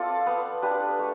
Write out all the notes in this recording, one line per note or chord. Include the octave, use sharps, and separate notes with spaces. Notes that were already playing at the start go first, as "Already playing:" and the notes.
Already playing: C4 F4 A4 D5
B3
D4 G4 B4
A3